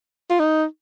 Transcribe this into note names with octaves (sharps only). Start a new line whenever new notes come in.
F4
D#4